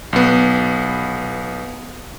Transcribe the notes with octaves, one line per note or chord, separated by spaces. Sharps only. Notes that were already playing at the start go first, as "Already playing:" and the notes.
B1 B3